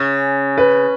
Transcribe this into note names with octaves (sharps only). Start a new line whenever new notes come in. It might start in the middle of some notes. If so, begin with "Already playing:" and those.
Already playing: C#3
B4